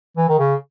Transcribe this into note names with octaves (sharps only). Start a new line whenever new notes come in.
E3
D#3
C#3